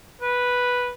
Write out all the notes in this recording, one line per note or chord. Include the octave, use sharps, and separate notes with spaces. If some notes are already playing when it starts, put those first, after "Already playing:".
B4